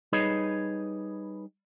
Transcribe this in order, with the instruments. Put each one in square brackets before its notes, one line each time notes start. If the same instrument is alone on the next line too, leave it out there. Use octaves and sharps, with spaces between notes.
[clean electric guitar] G3 D#4 G#4 B4 C#5 D#5